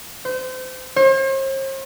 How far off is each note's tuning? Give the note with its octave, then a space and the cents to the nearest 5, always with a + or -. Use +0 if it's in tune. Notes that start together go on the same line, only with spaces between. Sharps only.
C5 -30
C5 +45